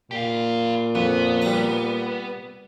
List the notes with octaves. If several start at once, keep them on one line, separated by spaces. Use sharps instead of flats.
A#2 G4 F5
F2 B3
G3 A#5